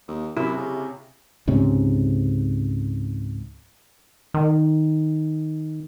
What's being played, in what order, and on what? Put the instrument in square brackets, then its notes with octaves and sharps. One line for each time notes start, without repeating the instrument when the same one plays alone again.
[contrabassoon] D#2
[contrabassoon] F#2 [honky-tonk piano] C3 [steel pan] E4
[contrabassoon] C#3
[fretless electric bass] C#2 G#2 C3 C#4
[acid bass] D#3